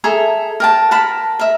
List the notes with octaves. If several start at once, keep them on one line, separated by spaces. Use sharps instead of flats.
G#4 A4 E5 A#5
A#4 G5 A5
A#4 F#5 A5 B5
A#4 E5